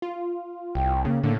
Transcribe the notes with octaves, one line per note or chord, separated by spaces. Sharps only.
F4
C2 G5
C#3 A#3
A2 D3 A#3